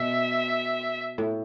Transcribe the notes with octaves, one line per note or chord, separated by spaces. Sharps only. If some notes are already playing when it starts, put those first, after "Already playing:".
Already playing: B2 E5
A2